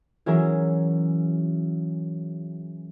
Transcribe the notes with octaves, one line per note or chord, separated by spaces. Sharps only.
E3 F#3 C#4 G#4 A#4 E5